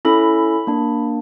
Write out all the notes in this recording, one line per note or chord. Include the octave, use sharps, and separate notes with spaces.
C#4 E4 A4 B5
A#3 D4